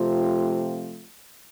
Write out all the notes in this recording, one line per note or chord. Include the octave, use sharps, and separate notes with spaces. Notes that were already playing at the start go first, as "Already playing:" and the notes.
Already playing: C3 F3 A3 C4 F4